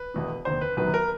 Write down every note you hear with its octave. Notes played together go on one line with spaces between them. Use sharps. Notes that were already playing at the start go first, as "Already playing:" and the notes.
Already playing: B4
E1 E2 B2
F1 D#2 D3 C5
B4
G1 F#2 D#3 F#3 B4
A#4